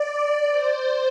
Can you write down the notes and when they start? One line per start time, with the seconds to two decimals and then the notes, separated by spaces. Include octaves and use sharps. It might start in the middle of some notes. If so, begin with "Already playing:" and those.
Already playing: D5
0.49 C5